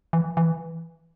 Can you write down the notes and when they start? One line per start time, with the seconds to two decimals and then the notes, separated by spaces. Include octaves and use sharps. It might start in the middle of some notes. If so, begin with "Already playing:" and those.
0.13 E3
0.37 E3